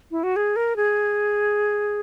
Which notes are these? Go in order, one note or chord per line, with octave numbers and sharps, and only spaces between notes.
E4
F#4
G#4
A#4
G#4